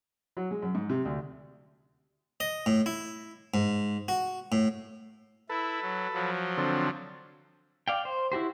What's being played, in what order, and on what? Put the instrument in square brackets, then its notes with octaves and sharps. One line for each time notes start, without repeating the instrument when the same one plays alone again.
[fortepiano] F#3
G#3
F#2
G#2
C3
D2
[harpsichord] D#5
A2
E4
G#2
F#4
A2
[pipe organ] E4 [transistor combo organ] A4 B4
[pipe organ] F#3
F3 F#3
[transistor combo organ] D3 C4 A4
[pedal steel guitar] D5 F5 G5
C5
E4 F#4 G4 C5